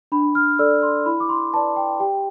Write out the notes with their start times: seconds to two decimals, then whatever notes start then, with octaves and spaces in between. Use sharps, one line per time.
0.12 D4 B5
0.35 F6
0.59 A4 D5 E6
0.83 C6
1.06 E4 B5
1.20 D6
1.29 C6
1.53 B4 A5
1.56 D5
1.76 G5
2.00 G4 G5